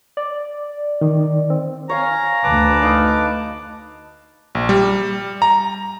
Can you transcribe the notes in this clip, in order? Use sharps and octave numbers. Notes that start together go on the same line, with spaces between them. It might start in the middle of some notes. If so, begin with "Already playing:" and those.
D5
D#3
C4
C#5 F5 G#5 A#5
D2 B4 A5 D6
D#4 D#5 F5
A#1
G3
A#5